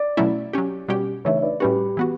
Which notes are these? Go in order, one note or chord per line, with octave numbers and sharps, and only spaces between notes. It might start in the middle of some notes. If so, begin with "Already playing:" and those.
Already playing: D5
B2 F#3 A3 C#4 E4
F#3 C#4 G4
B2 G3 C#4 G4
C#3 E3 A3 C#5 E5
E5
B4 D5
A2 G3 C#4 F#4 G4 B4
E3 B3 F#4